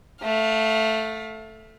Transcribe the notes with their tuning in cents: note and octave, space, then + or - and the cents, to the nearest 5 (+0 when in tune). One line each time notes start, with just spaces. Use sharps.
A3 +0 F5 +30